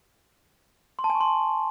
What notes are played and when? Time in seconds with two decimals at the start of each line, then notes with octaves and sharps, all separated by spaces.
0.99 C6
1.04 A5
1.10 G#5
1.15 C#6
1.21 C6